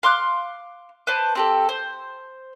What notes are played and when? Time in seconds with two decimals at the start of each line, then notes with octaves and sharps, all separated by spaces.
0.03 F5 C6 D6 F#6
1.07 B4 C5 A5 D6
1.35 C4 G4 A4
1.69 C5